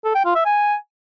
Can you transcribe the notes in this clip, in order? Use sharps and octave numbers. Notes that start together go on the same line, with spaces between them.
A4
G5
F4
E5
G#5